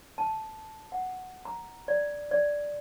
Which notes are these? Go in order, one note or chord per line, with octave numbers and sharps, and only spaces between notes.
A5
F#5
A#5
D5
D5